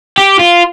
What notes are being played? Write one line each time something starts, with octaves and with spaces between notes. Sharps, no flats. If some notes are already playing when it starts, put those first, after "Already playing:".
G4
F4